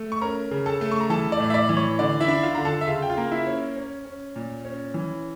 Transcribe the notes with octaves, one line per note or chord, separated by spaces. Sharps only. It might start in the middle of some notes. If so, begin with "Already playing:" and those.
Already playing: A3
C#6
C#4 A#4 A#5
C#3
A4 A5
A3
C#6
A#5
E3 A4 A5
D5
A2
E5
D5
E3
C#5
D3 D5
E4 E5
D4
F4 F5
D3 A#5
A4 A5
E5
C#3 F4 F5
G5
F4 F5
A#3
E4 E5
C#4
C#4
C#4
A#2
C#4
E3